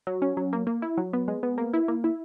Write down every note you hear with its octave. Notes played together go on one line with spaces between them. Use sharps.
F#3
C#4
F#3
A#3
A#3
E4
F#3
B3
G#3
B3
A#3
E4
A#3
E4